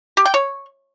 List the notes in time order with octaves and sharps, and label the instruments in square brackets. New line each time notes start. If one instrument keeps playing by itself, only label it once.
[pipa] G4
G5
C#5